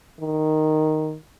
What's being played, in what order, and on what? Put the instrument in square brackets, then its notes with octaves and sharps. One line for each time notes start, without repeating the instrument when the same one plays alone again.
[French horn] D#3